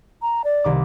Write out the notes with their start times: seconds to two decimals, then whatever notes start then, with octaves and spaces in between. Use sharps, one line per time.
0.21 A#5
0.44 D5
0.64 C2 D#3 D6